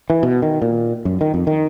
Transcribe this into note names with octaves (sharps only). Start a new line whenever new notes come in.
E3
B2
D#3
A#2
F#2
D#3
F2
D#3